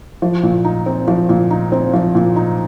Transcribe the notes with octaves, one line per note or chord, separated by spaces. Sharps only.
F3
A#2
D#4
C4
F3
A#2
D#4
C4
F3
A#2
D#4